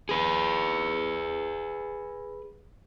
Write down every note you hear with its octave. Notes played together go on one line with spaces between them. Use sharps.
G#4 B4